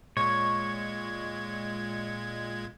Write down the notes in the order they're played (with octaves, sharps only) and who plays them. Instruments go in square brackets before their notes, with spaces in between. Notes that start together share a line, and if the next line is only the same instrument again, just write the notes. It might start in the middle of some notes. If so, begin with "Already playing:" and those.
[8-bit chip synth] A#2 G#3 G#6 [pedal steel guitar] C#5